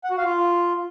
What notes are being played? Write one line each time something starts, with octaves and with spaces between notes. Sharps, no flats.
F#5
F#4
F5
F4